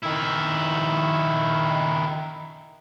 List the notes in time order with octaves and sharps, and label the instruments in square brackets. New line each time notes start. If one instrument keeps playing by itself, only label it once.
[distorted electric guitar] D#3 E4